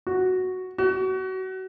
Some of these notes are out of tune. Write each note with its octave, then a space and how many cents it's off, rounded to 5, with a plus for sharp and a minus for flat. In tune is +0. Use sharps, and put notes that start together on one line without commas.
F#4 +0
F#4 +30